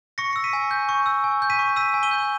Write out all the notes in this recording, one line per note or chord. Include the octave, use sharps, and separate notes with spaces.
C#6 A#6 C#7
E6 C#7
B6 D#7
G#5
G6
C#6
E6
G#5
G6
B6 D#7
C#6
E6 B6 D#7
G#5
D#7 G7
G6